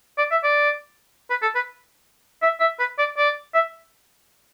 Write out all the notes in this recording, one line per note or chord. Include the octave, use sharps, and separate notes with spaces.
D5
E5
D5
B4
A4
B4
E5
E5
B4
D5
D5
E5